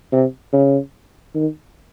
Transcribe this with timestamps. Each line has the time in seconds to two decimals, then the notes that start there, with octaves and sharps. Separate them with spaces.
0.12 C3
0.53 C#3
1.35 D#3